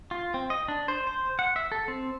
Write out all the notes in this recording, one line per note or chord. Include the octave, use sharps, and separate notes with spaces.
F4
C4
D#5
D4
C5
C5
F#5
E5
A4
C4